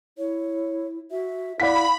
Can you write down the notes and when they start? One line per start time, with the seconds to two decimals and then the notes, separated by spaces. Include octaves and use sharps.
0.18 E4 C#5
1.11 F#4 E5
1.60 E4 D5 F5 F#5 B5 B6